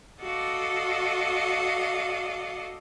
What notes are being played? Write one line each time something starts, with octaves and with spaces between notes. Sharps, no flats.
F#4 A4 D5 D#5 F5